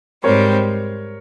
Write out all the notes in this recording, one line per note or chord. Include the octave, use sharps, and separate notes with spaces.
G#2 G3 C4 A#4 C#5